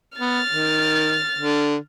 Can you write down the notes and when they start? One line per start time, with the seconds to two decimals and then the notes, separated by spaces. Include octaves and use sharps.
0.18 B3 F6 A6
0.50 D#3
1.38 D3